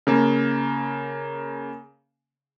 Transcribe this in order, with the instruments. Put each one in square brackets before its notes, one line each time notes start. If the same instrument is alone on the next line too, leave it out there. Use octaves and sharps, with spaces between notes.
[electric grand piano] C#3 A#3